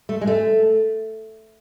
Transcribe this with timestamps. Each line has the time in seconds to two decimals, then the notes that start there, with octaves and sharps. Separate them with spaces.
0.09 A3
0.21 G#3
0.27 A3